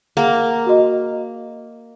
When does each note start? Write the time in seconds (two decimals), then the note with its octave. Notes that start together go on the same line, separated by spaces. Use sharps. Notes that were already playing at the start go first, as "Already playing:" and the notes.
0.17 A#3 G#4 F#5
0.66 F#4 D#5